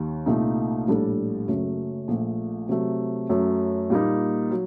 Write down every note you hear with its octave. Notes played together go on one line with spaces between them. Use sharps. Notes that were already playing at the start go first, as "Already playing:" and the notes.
Already playing: D#2 D#3
C2 A#2 A3 D#4
A#1 A2 G3 D4 A4
F#1 F#2 F#3 A3
A#1 A#2 A3
C3 F#3 A3
F#2 F#3 A3
A#2 G3 A#3 D#4
F#3